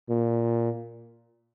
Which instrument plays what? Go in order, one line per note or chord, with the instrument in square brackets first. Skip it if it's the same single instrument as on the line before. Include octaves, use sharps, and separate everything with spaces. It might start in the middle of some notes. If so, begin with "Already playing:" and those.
[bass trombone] A#2